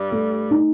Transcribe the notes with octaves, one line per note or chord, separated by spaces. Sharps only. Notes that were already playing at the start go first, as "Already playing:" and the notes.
Already playing: G2 G3
A3
D#4